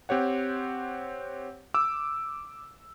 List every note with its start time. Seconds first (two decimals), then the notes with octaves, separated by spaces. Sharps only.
0.09 C4 G4 C#5 F#5
1.74 D6 E6